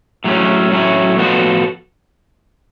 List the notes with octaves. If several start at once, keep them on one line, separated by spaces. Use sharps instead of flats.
A2 F#3 A3 C#4
A2 F#3 A3 C#4
A2 F3 B3 F#4 A4